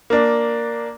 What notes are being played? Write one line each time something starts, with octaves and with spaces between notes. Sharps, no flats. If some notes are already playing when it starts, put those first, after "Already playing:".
A#3 D4